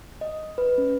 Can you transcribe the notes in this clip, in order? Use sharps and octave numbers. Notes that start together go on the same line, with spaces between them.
D#5
B4
C#4